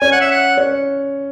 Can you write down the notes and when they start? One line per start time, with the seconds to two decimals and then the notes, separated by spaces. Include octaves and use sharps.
0.01 C#4 G#5
0.12 F#5
0.21 E5
0.31 F#5
0.57 C#4